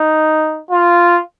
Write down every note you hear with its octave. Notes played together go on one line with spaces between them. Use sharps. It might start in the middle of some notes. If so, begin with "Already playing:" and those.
Already playing: D#4
F4